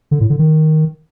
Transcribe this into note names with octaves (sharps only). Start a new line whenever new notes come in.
D3
A2
D3
D#3